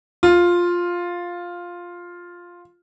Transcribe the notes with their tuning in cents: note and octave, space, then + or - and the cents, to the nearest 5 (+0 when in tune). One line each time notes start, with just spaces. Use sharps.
F4 +5